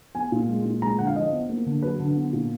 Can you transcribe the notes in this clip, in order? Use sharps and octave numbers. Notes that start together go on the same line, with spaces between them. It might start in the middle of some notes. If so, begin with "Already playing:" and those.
B3 G#5
A#2
G#3
A#2
G#3 A#5
D3 F#5
F5
F3 D#5
B3
A#3
D3
F#3 B4
D3
B3
A#2